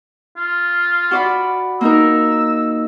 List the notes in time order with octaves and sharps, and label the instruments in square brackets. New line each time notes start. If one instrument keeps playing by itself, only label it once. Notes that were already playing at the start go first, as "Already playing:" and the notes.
[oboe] F4
[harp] F#4 D5 B5
[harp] A#3 D#4 A#4 [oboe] E6